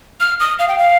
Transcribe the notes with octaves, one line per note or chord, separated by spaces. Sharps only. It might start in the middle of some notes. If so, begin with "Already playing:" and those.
F6
D#6
F5
G5
F5